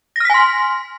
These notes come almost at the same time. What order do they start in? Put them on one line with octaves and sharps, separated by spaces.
A#6 F6 B6 G#5 C6